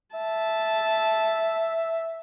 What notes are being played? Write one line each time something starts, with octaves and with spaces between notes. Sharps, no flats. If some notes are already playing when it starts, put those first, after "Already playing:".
E5 A5